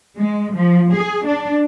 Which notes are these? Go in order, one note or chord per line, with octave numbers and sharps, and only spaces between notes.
G#3
F3
G#4
D4